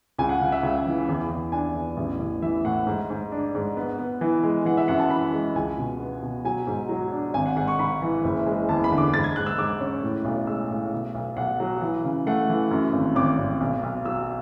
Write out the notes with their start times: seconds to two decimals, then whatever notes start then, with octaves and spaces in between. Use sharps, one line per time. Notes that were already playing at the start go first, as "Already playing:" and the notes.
0.18 C#2 G#5
0.29 F#5
0.41 C#3
0.52 E5
0.63 C#2
0.86 E3
1.09 E2
1.31 E2
1.52 D4 G#5
1.76 E2
1.97 A1
2.19 A1
2.42 E3 E5
2.65 A2 F#5
2.87 G#2
3.10 G#2
3.32 D4
3.55 G#2
3.77 B3
3.99 B3
4.21 E3
4.43 G#3
4.65 E3 F#5
4.77 E5
4.88 F#2 F#5
4.99 A5
5.10 E3 B5
5.33 G#3
5.55 C#2 G#5
5.78 B2
6.00 B3
6.22 B2
6.44 F#3 G#5
6.67 G#2
6.89 F#3
7.12 D4
7.34 G#1 G#5
7.46 F#5
7.56 G#2 F#5
7.68 C#6
7.79 G#2 B5
8.02 E3
8.24 F#1
8.46 G#3
8.69 E2 A5
8.84 B5
8.92 D3
8.98 D6
9.13 G#2 A6
9.24 G#6
9.36 G#2 F#6
9.46 E6
9.58 G#2 D6
9.81 C#4
10.03 A2
10.25 B1
10.47 G#3 E6
10.70 A2
10.92 B2
11.15 B1
11.37 B1 F#5
11.60 F#3
11.82 E3
12.05 C#3
12.27 A3 F#5
12.49 E3
12.71 F#2
12.93 G#1
13.15 G#1 D6
13.38 G#1
13.60 B1
13.83 B1
14.05 F#3 E6